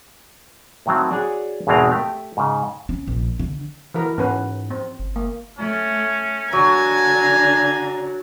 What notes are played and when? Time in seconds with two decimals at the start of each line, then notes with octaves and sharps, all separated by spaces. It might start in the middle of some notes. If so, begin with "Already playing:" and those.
0.86 A2 D#3 F#3 C4
1.11 D4 F#4 G#4 C#5 D5
1.67 G#1 E2 B2 G#3 C4 A#5
1.91 A3 G4
2.37 G#2 C#3
2.89 C#4
3.08 A#1
3.39 D3
3.94 E3 E4 A#4
4.18 G#2 B3 C#4 B4
4.70 C4
4.99 G1
5.16 A#3
5.58 A3 C#4
6.53 D3 F#3 D4 F#4 G#5 A#5